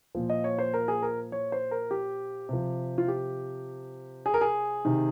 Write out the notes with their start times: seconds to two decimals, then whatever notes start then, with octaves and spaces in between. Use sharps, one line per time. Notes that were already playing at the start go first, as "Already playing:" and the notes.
0.15 A#2 F3
0.30 D#5
0.44 C#5
0.59 C5
0.74 A#4
0.88 G#4
1.02 A#4
1.32 C#5
1.52 C5
1.71 A#4
1.91 G4
2.49 C3 F3
2.98 F4
3.08 G4
4.26 G#4
4.34 A#4
4.41 G#4
4.85 C3 D#3